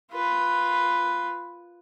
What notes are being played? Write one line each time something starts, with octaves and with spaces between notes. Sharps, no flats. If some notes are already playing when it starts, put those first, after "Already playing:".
F4 B4